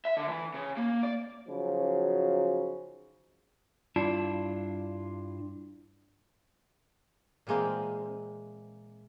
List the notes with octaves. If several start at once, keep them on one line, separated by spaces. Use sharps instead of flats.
E5
D3
E3
C#3
A#3
D5
C#3 F3 F#3 D#4 F#4
G2 D4 E4 F4 A5
A#2 E3 G#3 A#3 C4